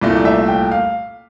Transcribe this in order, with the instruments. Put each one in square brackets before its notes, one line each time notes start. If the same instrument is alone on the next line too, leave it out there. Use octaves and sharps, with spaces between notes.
[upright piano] C2 A#2 A3 D5
D5
E5
G5
F5